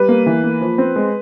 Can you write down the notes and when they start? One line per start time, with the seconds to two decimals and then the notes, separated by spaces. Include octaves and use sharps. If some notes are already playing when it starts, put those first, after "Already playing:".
Already playing: G3 B4
0.09 A#3
0.26 E3
0.43 A#3
0.61 F3
0.78 C4
0.96 G#3